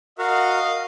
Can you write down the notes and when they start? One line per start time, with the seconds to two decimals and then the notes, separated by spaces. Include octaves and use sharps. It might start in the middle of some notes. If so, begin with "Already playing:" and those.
0.18 F#4 A#4 D#5 F5 F#5